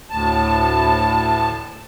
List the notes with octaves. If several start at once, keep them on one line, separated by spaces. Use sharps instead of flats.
D2 A2 A5